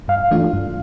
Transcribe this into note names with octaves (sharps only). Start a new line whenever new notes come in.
G2 F5
E3 A3 D4 F4
G2